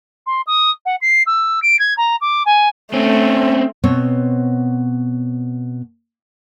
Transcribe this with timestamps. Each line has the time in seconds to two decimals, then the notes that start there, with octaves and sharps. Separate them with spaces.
0.27 C6
0.47 D#6
0.86 F#5
1.01 C7
1.26 E6
1.62 D7
1.79 G#6
1.97 A#5
2.21 D6
2.46 G#5
2.93 A3 C4 C#4
3.84 B2 B3 C4 C#5